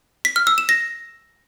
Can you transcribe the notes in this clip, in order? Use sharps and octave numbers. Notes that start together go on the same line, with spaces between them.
B6
F6
E6
E7
A#6